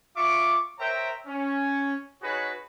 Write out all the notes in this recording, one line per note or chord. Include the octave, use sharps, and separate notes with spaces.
F4 E5 C#6 D6
A#4 C5 C#5 E5 G5 A#5
C#4
D#4 F#4 G#4 B4 C#5